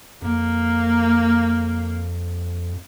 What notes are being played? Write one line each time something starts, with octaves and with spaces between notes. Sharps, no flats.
F2 A#3